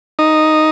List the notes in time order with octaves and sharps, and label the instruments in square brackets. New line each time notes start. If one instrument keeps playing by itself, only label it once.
[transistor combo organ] D#4